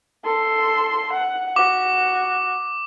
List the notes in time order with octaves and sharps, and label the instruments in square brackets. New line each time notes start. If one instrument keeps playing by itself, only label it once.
[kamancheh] A4 C6
F#5
[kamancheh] F#4 [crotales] D6